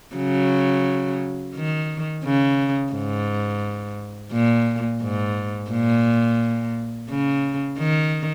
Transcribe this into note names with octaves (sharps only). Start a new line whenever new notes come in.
C#3 F#3
D#3
C#3
G#2
A#2
G#2
A#2
C#3
D#3